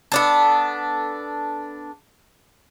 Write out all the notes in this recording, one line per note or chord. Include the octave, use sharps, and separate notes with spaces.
B3 D4 A4